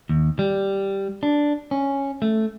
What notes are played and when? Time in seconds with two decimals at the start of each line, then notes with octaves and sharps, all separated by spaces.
0.09 D#2
0.39 G3
1.23 D4
1.71 C#4
2.22 A3